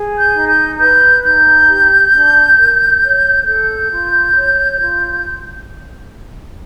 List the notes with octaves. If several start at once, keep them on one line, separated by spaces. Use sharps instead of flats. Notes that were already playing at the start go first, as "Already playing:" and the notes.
Already playing: G#4
G6
D#4
G6
B4 G6
D#4 G6
G4
D4
A#4
C#5
A4 G6
F4
C#5
F4